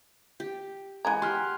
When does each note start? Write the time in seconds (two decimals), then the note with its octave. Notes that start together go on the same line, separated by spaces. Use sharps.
0.40 G4
1.05 E3 G#3 F#5 G#5 A#5 G#6
1.22 G4 C6 F6 F#6